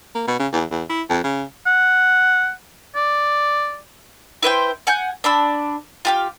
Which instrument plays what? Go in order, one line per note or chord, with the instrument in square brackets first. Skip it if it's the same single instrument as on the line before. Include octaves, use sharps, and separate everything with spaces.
[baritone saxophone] A#3
B2
C#3
E2
E2
E4
F2
C#3
[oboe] F#5
D5
[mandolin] E4 B4 C5 G5
F#5 G#5 G6
D4 B5 E6
F4 G4 F5